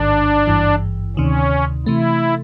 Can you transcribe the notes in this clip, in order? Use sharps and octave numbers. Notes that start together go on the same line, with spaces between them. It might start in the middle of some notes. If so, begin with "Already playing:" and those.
Already playing: A1 G#2 D#3 D4
G#1 G2 E3
D2 C3 D#3 C#4
C3 E3 A3 E4